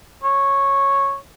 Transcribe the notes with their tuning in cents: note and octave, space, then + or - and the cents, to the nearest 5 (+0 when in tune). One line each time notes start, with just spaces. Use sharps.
C#5 -10